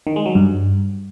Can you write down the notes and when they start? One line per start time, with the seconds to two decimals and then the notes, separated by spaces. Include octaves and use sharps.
0.07 D#3
0.16 G#3
0.26 F#3
0.35 G2